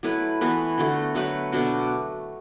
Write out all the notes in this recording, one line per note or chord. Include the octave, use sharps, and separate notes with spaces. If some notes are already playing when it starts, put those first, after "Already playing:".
F#3 A3 E4 B4
E3 B3 F#4 B4
D3 A3 F#4 A4
F#3 A3 F#4 B4
B2 A3 D4 F#4